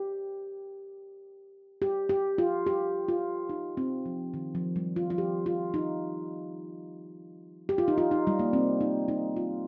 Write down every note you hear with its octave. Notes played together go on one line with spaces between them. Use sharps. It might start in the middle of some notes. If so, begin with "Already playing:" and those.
Already playing: G4
G4
G4
F4
G4
F4
D#4
C4
F3
D#3
F3
G3
F4
F4
G4
F4
D#4
G4
F4
D#4
F4
D#4
G3
A#3
C4
D#4
D#4
F4